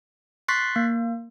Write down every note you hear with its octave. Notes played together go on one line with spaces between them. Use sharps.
C6 C#6 F#6 A6 B6 C7
A#3